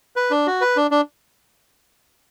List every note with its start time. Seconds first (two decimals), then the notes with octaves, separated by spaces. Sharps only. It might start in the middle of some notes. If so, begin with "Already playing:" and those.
0.16 B4
0.31 D4
0.47 F#4
0.61 B4
0.76 D4
0.91 D4